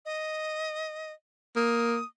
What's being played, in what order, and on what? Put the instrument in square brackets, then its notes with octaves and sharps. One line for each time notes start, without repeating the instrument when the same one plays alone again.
[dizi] D#5
[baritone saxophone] A#3 [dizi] D#6